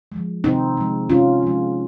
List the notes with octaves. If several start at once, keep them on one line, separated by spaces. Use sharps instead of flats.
F3 G#3
C3 C4 D#4
F3 G#3
C3 C#4 F4
F3 G#3